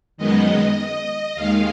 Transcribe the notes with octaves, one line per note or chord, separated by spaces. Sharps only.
F#2 D#3 G#3 B3 D#5
D#2 D#3 G#3 F5